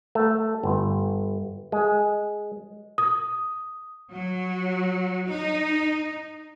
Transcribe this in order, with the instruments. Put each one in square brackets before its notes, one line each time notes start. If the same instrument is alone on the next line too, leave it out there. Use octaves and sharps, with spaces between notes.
[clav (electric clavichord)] A3
G1
G#3
[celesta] D#6
[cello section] F#3
D#4